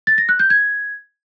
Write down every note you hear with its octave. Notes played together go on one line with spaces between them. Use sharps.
A6
A#6
F#6
G6
G#6